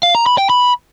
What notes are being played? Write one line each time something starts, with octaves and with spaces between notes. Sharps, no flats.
F5
A#5
B5
G5
B5